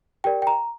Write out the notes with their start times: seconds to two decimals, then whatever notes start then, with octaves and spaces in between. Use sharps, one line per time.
0.24 G4 A#4 D5 G5
0.42 G5
0.47 A#5